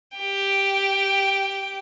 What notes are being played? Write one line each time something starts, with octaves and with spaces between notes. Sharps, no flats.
G4 G5